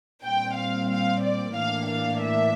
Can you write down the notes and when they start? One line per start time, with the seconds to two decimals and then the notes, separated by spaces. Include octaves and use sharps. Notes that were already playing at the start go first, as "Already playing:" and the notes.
0.24 A#2 G3 C4 G5
0.56 F5
0.91 F5
1.24 D5
1.57 A2 E3 A#3 D4 F5
1.89 F5
2.22 E5